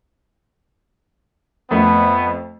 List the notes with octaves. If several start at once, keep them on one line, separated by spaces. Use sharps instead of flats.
F2 A3 B3